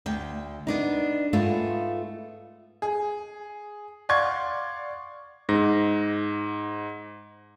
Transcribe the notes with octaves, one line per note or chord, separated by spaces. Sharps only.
D2 G5
B3 D4 D#4
G#2 A3 B3 F4
G#4
D5 F5 F#5 C6 C#6 G#6
G#2 A#6